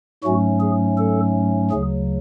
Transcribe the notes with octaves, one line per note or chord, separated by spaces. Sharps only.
G#2 F#3 A3 C#4 F#4
G#4
A4
D2 C#3 F#3 G#4